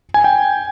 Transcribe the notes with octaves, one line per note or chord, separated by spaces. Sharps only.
G#5
G5